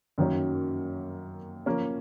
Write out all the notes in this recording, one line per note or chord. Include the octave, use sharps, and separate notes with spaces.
F#2 D#3 F#3 A#3 C#4
F3 A#3 C#4